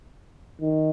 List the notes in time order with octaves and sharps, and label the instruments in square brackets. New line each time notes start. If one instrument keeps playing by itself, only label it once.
[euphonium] D#3